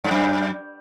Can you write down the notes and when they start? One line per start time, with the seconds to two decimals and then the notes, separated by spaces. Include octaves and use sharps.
0.04 G2
0.11 F#2